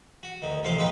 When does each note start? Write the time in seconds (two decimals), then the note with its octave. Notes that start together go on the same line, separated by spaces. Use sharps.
0.23 F#4
0.42 D2 D#3
0.63 A1 C3 F3 F5 C6 D6
0.77 A#1 G#2 D#4 F4 B4 G5